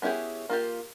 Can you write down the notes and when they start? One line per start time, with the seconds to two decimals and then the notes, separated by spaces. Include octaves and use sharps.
0.02 B3 C#4 E4 G4 G#4
0.49 A#3 F4 G4